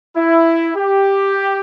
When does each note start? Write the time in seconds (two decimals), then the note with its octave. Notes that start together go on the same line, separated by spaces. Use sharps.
0.17 E4
0.76 G4